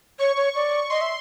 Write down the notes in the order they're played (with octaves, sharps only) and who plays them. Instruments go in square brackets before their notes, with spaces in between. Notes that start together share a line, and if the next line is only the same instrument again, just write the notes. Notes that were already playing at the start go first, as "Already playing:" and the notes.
[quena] C#5 [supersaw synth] C#6
[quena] C#5
D5
[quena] D#5 [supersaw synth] C6
[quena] E5